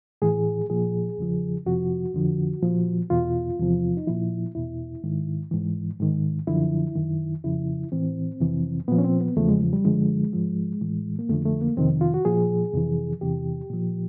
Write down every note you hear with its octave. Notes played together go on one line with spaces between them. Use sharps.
A2 E3 G#4
A#2 F3 G#4
E2 C#3 F3
F2 C3 F3 F#4
F2 D3 F3
A#2 F3
E2 B2 F4
E2 C3 F3
D#4
A#2 F3 E4
E2 B2 E4
G#2 D#3
G#2 E3
G#2 D#3
F#2 D3 F3 E4
F#2 D#3
F2 C#3 F3 E4
A2 E3 C4
F2 C3 E3
A#2 F3 B3
C#4
C4
B3
E2 C#3 F3 A3
G#3
G3
F#2 D3 F3 G#3
G#2 F3
A2 E3
A#3
F2 D3 F3 A3
A3
A#3
F2 C3 D#3 C4
F4
F#4
A#2 F3 G#4
F2 C3 E3
E2 C3 E3 G4
A#2 F3